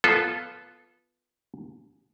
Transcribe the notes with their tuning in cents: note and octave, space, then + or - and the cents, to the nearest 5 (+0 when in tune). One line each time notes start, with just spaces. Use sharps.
B3 +0 F4 +0 A4 -20